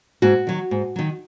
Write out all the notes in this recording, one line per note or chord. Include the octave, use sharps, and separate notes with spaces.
G#2 F#4
D#3 F#3
G#2
D#3 F#3